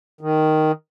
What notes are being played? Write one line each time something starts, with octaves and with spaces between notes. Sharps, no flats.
D#3